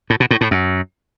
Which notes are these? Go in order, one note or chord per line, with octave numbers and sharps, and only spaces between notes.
A2
B2
A2
A2
F#2